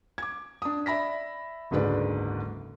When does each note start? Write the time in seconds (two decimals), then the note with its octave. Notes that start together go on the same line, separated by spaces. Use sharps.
0.18 D6 G#6
0.62 D4 D#6
0.86 D5 E5 B5 A#6 B6
1.71 F#1 D2 G#2 G#4 B4 D5